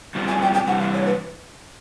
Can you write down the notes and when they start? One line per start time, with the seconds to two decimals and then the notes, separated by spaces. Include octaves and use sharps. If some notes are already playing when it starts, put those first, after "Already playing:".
0.15 B2 G3 C4 F4
0.28 G#5
0.42 G5
0.54 G5
0.67 C3 E3 G3 F#5
0.80 F5
0.94 C#5
1.06 B4